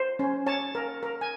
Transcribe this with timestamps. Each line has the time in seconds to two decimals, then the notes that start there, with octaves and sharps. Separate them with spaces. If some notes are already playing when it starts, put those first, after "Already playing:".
Already playing: C5
0.19 C#4
0.46 C#5 A5
0.75 A#4
1.03 A#4
1.21 G#5